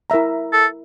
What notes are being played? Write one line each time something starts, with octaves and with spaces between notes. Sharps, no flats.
E4 A#4 E5 A#5
A4